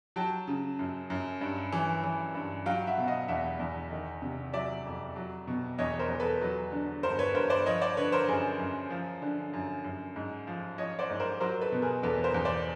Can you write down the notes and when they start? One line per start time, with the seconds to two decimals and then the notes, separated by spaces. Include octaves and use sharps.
0.16 F#3 G5 A5
0.47 C#3
0.79 F#2
1.10 F#2
1.41 G2
1.73 E3
2.04 E3
2.35 G2
2.66 F#3 F5 G5
2.87 E5 F#5
2.98 B2
3.08 D#5 F5
3.28 E2 E5 F#5
3.60 E2
3.91 D#3
4.22 C3
4.53 F#3 D5 E5
4.85 F2
5.16 F#3
5.47 B2
5.78 E2 C#5 D#5
5.99 A#4 C5
6.09 E2
6.20 A4 B4
6.41 F#3
6.72 D3
7.03 G2 A#4 C5
7.19 B4 C#5
7.35 G2 A#4 C5
7.50 C5 D5
7.66 F3 C#5 D#5
7.81 C5 D5
7.97 D3 B4 C#5
8.12 A#4 C5
8.28 F#2 G#4 A#4
8.59 F#2
8.90 F3
9.22 D3
9.53 F#2
9.84 F#2
10.16 G#2
10.47 F3
10.78 F3 C#5 D#5
10.99 C5 D5
11.10 G#2
11.20 A#4 C5
11.40 F#3 A#4 C5
11.52 A#4
11.61 A4 B4
11.72 B2
11.82 G#4 A#4
12.03 E2 A4 B4
12.24 A#4 C5
12.34 E2
12.45 C5 D5